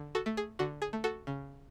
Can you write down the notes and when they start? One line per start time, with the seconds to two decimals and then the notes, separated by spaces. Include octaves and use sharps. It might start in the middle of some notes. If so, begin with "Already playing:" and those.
Already playing: D3
0.15 F#4 A4
0.26 A3
0.37 G#4
0.59 D3 F#4
0.82 G#4
0.93 A3
1.04 F#4 A4
1.27 C#3